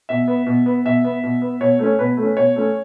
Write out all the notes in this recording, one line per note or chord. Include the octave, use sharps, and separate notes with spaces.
B2 E5
B3
B2
B3
B2 E5
B3
B2
B3
B2 C#5
A3 C#4
B2 B4
A3
C#4
B2 C#5
A3 C#4